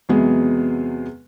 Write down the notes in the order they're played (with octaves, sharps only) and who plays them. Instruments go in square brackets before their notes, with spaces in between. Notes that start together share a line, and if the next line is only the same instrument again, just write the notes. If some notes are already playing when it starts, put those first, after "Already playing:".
[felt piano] E2 C3 F#3 G#3 B3 G#4